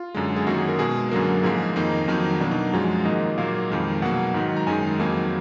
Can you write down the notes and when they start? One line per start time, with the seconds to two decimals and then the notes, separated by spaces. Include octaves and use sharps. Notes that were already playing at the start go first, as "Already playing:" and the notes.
Already playing: F4
0.14 F#2 D3 G#3
0.36 G#4
0.47 F#2 D#3 A#3 F#4
0.58 G#4
0.68 A#4
0.79 B2 G#3 G#4
1.11 F#2 D3 F#3 A#3 A#4
1.43 G#2 F3 A#3 G#4
1.76 F2 D#3 A#3 D#4
2.08 F2 D#3 F#3 A#3
2.40 B2 F#3 A#3 D4
2.51 D#4
2.73 F#2 F3 G#3 F#4
3.05 G#2 D#3 A#3 D#5
3.38 A#2 F#3 A#3 F5
3.70 F2 D#3 G#3
4.02 B2 F#3 A#3 F#5
4.34 G#2 D#3 F#3
4.57 A#5
4.67 F#2 D#3 G#3 G#5
4.99 F2 D#3 F#3 A#3